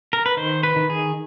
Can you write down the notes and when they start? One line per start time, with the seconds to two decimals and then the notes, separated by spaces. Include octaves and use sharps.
0.13 A#4
0.26 B4
0.37 D#3 C5
0.63 B4
0.76 D#3
0.90 G#4